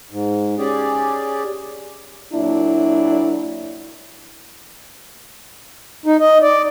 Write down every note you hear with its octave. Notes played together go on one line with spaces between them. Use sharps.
G#2
C#4 G4 G#4 D5
A#2 F#3 D4 E4
D#4
D#5
D5